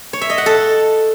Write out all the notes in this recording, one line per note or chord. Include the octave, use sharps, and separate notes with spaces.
C#5
E5
D#5
F#5
A4